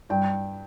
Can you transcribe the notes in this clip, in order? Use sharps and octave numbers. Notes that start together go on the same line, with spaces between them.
G2 G5